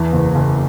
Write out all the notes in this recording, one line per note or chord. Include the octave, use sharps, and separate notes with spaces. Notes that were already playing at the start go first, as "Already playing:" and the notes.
Already playing: E2 E3 A5
F#1
F#1